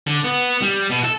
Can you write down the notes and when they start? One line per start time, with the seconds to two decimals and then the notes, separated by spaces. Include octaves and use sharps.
0.07 D3
0.24 B3
0.62 G3
0.90 B2
1.04 A4